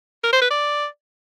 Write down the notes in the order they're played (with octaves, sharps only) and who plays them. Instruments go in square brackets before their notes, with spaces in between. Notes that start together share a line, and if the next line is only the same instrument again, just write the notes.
[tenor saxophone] A#4
C5
B4
D5